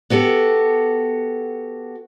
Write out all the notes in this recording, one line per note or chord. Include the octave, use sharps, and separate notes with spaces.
B3 F#4 G4 A4